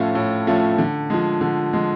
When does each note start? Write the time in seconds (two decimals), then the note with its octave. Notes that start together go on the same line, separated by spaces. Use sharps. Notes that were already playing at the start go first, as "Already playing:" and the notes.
Already playing: A2 F3 A3 C#4 F4
0.15 A2
0.47 F3 A3 C#4 F4
0.78 D3
1.10 F3 G#3
1.41 D3
1.73 F3 G#3